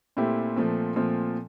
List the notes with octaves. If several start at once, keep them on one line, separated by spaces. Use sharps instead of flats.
A#2 A3 C4 E4 G4
A#2 F3 A3 C4
A#2 F3 A3 C4